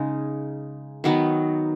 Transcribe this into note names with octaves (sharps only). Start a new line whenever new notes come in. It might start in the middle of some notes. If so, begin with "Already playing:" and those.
Already playing: C#3 G#3 D#4
D#3 F#3 B3 D#4